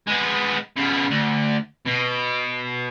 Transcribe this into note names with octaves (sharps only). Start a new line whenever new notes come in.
G#3 B3
C#3 B3
D2
B2